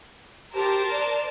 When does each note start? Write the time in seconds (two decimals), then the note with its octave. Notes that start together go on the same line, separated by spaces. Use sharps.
0.55 G4 A#4 C5 A5
0.91 D5